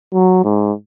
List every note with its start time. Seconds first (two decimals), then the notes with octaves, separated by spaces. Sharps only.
0.14 F#3
0.44 G#2